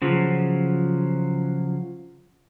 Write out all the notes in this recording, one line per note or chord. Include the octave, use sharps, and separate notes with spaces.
C#3 F3 F#3